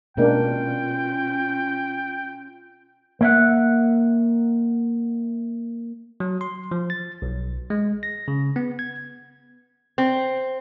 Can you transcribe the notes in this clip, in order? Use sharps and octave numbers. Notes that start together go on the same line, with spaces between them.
B2 G#3 A#3 C#4 D4 F4 G5
A#3 E5 F#5
F#3
C6
F3
A6
B1
G#3
A#6
C#3
B3
G#6
C4